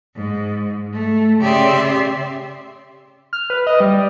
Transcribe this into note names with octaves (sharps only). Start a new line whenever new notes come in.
G#2
A3
C#3 G4 D5 E5 C6
F6
B4
D#5
G3